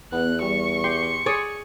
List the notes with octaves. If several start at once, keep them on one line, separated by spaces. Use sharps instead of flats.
E2 B3 F#6
G3 C#6
G4 C6
G#4 C#5 D5